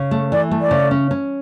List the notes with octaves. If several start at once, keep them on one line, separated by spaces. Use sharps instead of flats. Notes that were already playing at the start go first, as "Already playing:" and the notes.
Already playing: C#3
A3
E3 D5
A3
D5
C#3
C#4
C#4